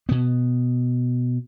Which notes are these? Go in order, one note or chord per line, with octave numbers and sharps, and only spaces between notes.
B2 B3